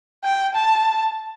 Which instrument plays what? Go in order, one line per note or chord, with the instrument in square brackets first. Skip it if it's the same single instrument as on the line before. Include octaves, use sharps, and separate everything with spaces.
[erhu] G5
A5